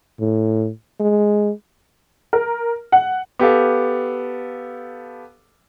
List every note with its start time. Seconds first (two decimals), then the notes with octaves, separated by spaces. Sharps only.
0.20 A2
1.00 G#3
2.33 A#4
2.92 F#5
3.39 B3 G4 A4 F5